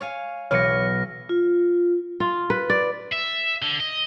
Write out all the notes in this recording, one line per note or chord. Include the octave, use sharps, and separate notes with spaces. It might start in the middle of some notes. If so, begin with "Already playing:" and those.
C#5 F5 G#5
B1 E3 B4 C#5 F6 A#6 C#7
F4
F4
B4
D5
E5
D3
D#5